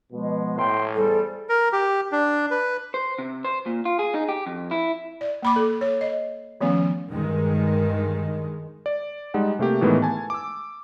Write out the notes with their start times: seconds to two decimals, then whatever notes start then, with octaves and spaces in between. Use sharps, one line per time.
0.13 B2 F3 G#3
0.56 A2 G5 C6
0.95 E2 G3 G#4 A4 C5
1.49 A#4
1.73 G4
2.12 D4
2.51 B4
2.94 C5
3.19 C3
3.44 C5
3.66 A#2
3.85 F4
3.99 G#4
4.14 D#4
4.29 G4
4.46 F2
4.71 E4
5.21 D5
5.43 A#3 B5 D6
5.56 A4
5.81 C#5
6.01 D#5
6.61 D#3 F3 A3 B3 C#4
7.12 G2 D#3 G#3
8.86 D5
9.34 G3 G#3 D#4 F#5
9.59 C3 A3 A#3 G4
9.81 A2 D#3 E3 G#3 A3 B3
10.02 G#5 A5
10.30 D6 E6